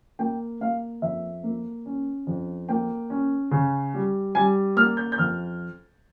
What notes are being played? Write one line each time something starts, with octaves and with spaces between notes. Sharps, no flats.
A#3 G5
A#3 F5
F2 E5
A#3
C#4
F2
A#3 G5
C#4
C#3
G3
G3 G#5
A#3 F6
G6
G6
F2 F6